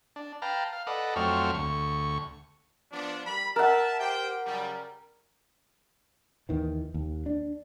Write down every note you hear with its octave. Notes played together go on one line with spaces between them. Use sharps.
D4
B4 F5 G5 A5 A#5
F5
A4 B4 D5 D#5 F#5
F2 F#3 A3 C4 C#6 F6
D2 C#6
F3 B3 D4
G3 A#4 B5
A#4 E5 F#5 A5
G4 C5 G5
C#3 F#3 G3
D#2 D#3 E3
D#2
D4